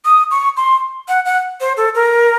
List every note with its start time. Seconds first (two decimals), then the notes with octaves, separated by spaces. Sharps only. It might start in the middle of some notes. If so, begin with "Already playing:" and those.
0.05 D#6
0.31 C#6
0.57 C6
1.08 F#5
1.25 F#5
1.60 C5
1.77 A4
1.95 A#4